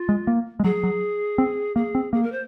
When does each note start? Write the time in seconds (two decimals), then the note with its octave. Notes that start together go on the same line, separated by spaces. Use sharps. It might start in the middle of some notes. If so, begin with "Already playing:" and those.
Already playing: F4
0.09 G#3
0.27 A#3
0.60 G#3
0.64 F#3 G#4
0.83 F#3
1.38 C4
1.76 A#3 G#4
1.95 C4
2.13 A#3 G#4
2.23 A#4
2.32 C5